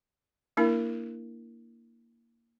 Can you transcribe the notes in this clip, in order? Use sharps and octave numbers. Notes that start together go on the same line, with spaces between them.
A#3 D4 E4 A#4